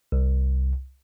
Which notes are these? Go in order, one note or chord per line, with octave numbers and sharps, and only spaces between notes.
C2